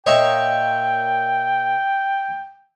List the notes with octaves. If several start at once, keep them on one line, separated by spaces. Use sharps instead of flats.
A#2 A#3 C#5 D#5 E5 G5